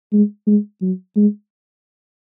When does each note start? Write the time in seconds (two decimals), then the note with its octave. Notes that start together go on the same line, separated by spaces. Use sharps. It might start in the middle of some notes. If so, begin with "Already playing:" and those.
0.13 G#3
0.47 G#3
0.81 F#3
1.16 G#3